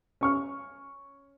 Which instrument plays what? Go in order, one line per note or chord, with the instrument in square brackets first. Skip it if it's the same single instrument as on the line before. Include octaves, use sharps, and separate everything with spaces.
[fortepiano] C#4 C#6 F6